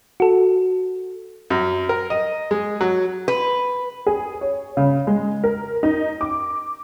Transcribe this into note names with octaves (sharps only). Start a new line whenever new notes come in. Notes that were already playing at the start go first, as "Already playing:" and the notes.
F#4 A4
F#2
A#4
D#5
G#3
F#3
B4
G#4
C#5
C#3
G#3
A#4
D#4
D6